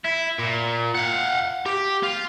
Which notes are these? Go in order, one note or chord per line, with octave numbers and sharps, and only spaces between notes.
E4
A#2
F5 F#5
G4
F4